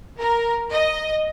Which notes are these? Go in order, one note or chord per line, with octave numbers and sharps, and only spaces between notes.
A#4
D#5